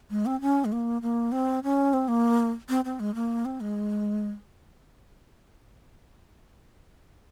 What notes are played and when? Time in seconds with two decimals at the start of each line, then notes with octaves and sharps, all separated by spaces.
0.10 G#3
0.26 C4
0.41 C#4
0.65 G#3
0.72 A#3
1.02 A#3
1.32 C4
1.63 C#4
1.93 C4
2.08 A#3
2.69 C4
2.85 C4
3.00 G#3
3.15 A#3
3.45 C4
3.60 G#3